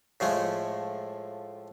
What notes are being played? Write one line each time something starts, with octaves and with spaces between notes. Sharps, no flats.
A2 F3 G#3 A3